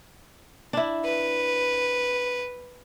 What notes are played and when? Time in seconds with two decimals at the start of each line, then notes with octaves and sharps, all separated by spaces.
0.73 D4 E4
1.04 B4